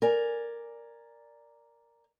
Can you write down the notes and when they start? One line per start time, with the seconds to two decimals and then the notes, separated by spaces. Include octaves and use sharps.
0.02 A#4 D5 G#5